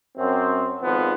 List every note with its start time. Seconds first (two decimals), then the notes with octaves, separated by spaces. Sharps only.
0.17 F#2 C4
0.82 G#1 F2 F3 B3